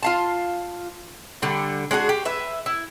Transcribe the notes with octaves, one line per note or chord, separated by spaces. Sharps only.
F4 F5 A5
D3 G3 A3
G#3 D4 F#4 G#4
G4
B4 E5
E4